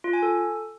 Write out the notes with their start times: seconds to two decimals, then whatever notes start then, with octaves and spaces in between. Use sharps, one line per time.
0.04 F4
0.13 G#5
0.23 A4